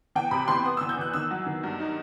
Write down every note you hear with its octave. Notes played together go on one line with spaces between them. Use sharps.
E3 G5
C3 B5
E3 C6
B3 D#6
E6
E3
G6
E3 F#6
D#3 E6
F#3
D#3
G2
D#4